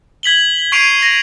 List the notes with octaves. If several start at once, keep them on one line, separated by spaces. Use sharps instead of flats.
G#6 B6 F#7 G7
C#6 G#6 C7 D7 D#7 F7
A#6